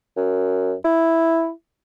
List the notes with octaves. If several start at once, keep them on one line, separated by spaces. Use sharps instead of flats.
F#2
E4